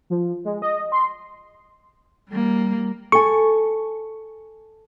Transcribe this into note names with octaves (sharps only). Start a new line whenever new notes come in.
F3
G#3
D#5
C6
G3 A#3
A4 G#5 C#6